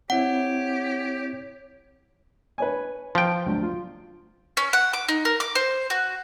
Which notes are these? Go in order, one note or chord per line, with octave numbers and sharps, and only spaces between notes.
C4 E4 G4 C#5 F#5
B4 C#5 G#5
F3 G5
D2 F#3
F4
C#4
F#5
D6
D#4
A#4
D6
C5
F#4